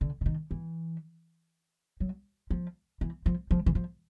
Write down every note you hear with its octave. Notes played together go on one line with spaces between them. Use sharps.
D3
D3
D#3
E3
F#3
F3
E3
F3
F3
E3
F3